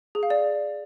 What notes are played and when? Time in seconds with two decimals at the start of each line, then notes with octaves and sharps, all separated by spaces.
0.15 G#4
0.23 F5
0.30 D5